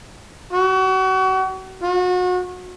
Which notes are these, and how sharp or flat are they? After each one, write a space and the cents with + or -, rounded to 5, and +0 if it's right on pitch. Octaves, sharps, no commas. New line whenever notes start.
F#4 +35
F#4 -35